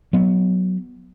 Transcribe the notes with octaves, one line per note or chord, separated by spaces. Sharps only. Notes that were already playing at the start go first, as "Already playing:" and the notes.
F#3 B3